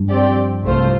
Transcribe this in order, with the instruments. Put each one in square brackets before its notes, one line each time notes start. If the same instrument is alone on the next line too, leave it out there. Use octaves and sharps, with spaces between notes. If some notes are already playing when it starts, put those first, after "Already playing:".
Already playing: [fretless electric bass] G2
[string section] F3 C4 G4 D5
C2 C3 A3 F4 C5